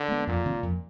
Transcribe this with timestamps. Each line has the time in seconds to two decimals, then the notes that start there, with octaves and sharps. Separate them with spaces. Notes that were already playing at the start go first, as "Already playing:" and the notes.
Already playing: D3
0.08 G#3 B3
0.27 F2 A#2
0.45 C3 D#3
0.63 F2